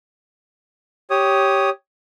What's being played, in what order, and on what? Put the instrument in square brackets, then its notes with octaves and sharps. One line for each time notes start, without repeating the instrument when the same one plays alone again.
[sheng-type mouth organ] G4 C#5 D#6